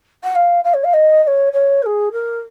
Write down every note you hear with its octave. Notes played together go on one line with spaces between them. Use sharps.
F#5
F5
F5
C#5
F5
D#5
D#5
C#5
C#5
A#4
G#4
A#4